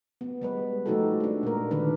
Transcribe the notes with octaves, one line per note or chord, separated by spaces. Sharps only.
B3
G3 G#3 B4
F3 A3 D#4 F#4 G4 A4
G#3 D4
A#2 A#3 A#4
D3 D#3 D4 B4